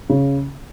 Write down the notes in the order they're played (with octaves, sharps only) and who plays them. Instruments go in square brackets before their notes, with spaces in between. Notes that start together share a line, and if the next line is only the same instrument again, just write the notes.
[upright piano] C#3